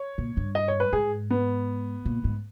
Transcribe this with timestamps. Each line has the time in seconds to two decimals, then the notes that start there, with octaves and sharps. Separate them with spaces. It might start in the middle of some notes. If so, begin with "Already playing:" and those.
Already playing: C#5
0.18 A#2
0.37 G2
0.55 D#5
0.68 C#5
0.80 B4
0.93 G#2 G#4
1.30 B3
2.05 A#2
2.24 G#2